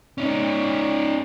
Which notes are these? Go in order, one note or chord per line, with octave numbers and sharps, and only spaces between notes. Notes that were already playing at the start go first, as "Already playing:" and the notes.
C#4 D#4